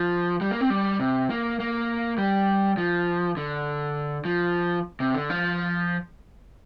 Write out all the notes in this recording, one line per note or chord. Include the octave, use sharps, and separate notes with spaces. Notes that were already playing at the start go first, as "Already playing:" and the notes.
Already playing: F3
G3
A#3
C4
G3
C3
A#3
A#3
G3
F3
D3
F3
C3
D3
F3